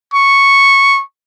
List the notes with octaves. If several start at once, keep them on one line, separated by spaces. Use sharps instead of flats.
C#6